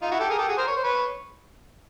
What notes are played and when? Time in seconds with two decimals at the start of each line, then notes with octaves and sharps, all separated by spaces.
0.02 D#4 F4
0.11 E4 F#4
0.20 G4 A4
0.30 G#4 A#4
0.39 G4 A4
0.48 F#4 G#4
0.57 A#4 C5
0.67 C#5
0.76 C5
0.84 B4 C#5